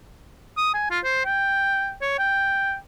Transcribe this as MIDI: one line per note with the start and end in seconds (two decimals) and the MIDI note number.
0.57 0.73 87
0.74 0.90 80
0.90 0.99 65
1.04 1.23 72
1.25 1.93 79
2.01 2.15 73
2.19 2.76 79